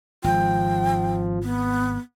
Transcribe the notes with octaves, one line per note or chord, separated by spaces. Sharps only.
G#1 F3 G5
B3